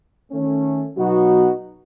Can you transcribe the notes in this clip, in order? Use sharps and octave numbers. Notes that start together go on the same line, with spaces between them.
D#3 A3 C#4
B2 F#3 B3 D#4 F#4